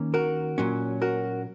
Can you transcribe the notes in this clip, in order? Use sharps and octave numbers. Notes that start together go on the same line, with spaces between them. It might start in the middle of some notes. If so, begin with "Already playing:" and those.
Already playing: D#3 A#3 C#4
F#4 A#4
A#2 F#3 C#4
F#4 A#4